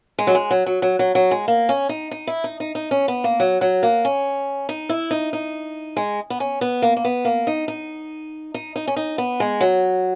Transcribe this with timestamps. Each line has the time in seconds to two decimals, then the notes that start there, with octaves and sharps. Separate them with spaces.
0.19 G#3
0.27 F#3
0.35 G#3
0.50 F#3
0.66 F#3
0.82 F#3
0.99 F#3
1.15 F#3
1.31 G#3
1.48 A#3
1.69 C#4
1.89 D#4
2.11 D#4
2.27 E4
2.44 D#4
2.60 D#4
2.75 D#4
2.91 C#4
3.08 B3
3.24 A#3
3.40 F#3
3.61 F#3
3.83 A#3
4.05 C#4
4.69 D#4
4.89 E4
5.11 D#4
5.33 D#4
5.97 G#3
6.30 B3
6.40 C#4
6.61 B3
6.82 A#3
6.96 A#3
7.05 B3
7.25 A#3
7.47 D#4
7.68 D#4
8.54 D#4
8.76 D#4
8.87 C#4
8.96 D#4
9.18 B3
9.40 G#3
9.61 F#3